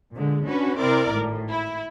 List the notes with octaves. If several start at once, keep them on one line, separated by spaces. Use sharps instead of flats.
A#2 D3 G#3
C#4 D4 F#4 B4
C3 C4 E4 A#4 D5 D6
G#1 A2
E4